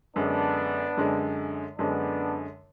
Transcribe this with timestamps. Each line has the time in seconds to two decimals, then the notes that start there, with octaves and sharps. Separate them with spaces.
0.15 F#2 D3 G#3 B3 D4
0.97 F#2 D3 G#3
1.78 F#2 D3 G#3 B3 D4